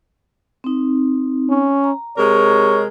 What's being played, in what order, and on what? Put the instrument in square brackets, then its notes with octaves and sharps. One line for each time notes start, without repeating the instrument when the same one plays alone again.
[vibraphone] C4 D#4
[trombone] C#4
[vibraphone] A#5
[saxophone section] C3 G#3 A#4 [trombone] C#5